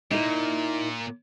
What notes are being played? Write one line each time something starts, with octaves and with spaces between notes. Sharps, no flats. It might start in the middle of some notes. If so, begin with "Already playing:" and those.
A#2 D#4 E4 A#4